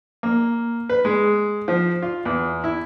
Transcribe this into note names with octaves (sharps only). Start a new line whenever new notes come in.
A#3
B4
G#3
F3
F4
E2
E4